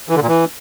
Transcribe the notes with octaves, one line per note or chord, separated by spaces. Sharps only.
E3
D3
A#2
E3